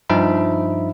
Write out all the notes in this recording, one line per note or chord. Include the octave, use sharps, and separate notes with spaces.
G2 F3 D#4 E5 B5